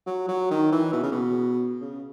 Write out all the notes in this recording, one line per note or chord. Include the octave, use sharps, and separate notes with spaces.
F#3
F#3
D#3
E3
B2
C#3
B2
C#3